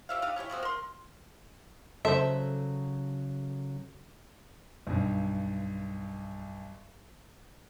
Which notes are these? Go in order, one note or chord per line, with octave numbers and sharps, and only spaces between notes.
G4 C#5 E5 F5
D4 D#4 G4 F5
C#4 E4 G4 C#5
F3 G#3 C4 F#4
A#4 C6
C#3 F#3 A4 C5 E5
B1 G2